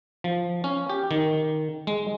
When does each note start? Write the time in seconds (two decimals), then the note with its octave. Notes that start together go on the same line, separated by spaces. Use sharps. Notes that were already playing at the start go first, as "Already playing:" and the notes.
0.24 F3
0.64 C#4
0.90 G4
1.11 D#3
1.87 G#3